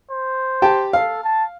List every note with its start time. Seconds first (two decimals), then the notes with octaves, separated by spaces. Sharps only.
0.11 C5
0.62 G4 G5 A5
0.93 A4 F5
1.24 A5